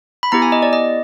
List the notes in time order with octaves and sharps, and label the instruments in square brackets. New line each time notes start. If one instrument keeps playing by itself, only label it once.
[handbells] B5
B3 E4 G4 A#5
G#5
D#5
D5
D#5